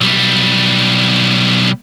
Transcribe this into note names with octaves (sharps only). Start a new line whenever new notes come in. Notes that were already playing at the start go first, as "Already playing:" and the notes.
B1 G3